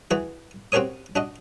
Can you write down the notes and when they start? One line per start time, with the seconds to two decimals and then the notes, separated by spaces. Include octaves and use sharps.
0.11 E3 F#4 G#4
0.72 C4 F#4 G4 A#4 C#5 D#6
1.16 D4 F#4 D#5